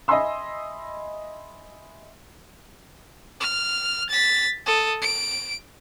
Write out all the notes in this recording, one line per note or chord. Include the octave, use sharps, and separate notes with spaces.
D#5 E5 G#5 B5 C6 E6
F6
A6 B6
A4 D#6
D7